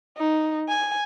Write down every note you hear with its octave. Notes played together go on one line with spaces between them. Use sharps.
D#4
G#5